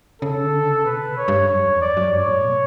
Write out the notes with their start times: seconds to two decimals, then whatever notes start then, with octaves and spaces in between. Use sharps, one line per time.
0.22 C#3 A4
0.43 D3
0.65 C#3
0.85 B2 B4
1.17 C#5
1.28 G2
1.48 F#2 C#5
1.65 E2
1.81 F#2 D5
1.97 F#2
2.12 G2 C#5
2.28 A2
2.44 B2